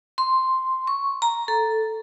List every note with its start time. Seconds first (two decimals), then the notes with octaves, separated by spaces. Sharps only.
0.18 C6
0.87 C#6
1.22 A#5
1.48 A4